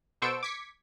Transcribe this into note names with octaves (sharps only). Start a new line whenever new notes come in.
B2 A4 C5 C#6 E6 D7
D6 G#6 B6 C#7